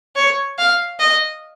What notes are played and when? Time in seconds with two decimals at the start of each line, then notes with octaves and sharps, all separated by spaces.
0.16 C#5
0.58 F5
1.00 D#5